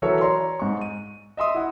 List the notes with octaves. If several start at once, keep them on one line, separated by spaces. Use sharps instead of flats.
E3 F#3 A4 A#4 C#5 E5
C#5 D5 A#5 C6
G#2 C#6
D#7
D#5 E5 C6 D#6
E4 F#5